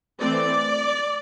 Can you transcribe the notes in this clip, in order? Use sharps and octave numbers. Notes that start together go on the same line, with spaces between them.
E3 A3 C4 D5